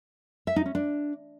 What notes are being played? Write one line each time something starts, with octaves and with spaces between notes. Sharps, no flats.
E5
D#4
C#4
D4